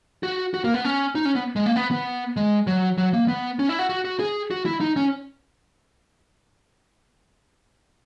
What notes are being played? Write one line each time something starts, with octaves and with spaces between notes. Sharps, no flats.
F#4
F#4
A#3
B3
C#4
D#4
C#4
B3
G#3
A#3
B3
B3
G#3
F#3
F#3
A#3
B3
C#4
E4
F#4
F#4
F#4
G#4
F#4
E4
D#4
C#4